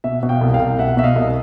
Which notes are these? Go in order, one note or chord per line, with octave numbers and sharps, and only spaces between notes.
B2 E5
B2
F5 G5
C2
F5 G5
C2
B2 E5 F#5
B2 E5
D#5 F5
C2